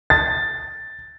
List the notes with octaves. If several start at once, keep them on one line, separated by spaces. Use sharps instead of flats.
A6